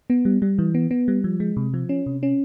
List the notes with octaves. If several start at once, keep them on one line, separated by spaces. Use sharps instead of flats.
B3
G3
G3
E3
B3
B3
G3
F3
G#3
C3
F3
C#4
C3
C#4